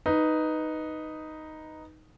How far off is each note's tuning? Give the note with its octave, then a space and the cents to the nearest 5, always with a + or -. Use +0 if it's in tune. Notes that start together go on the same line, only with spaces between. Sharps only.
D#4 +0 B4 +0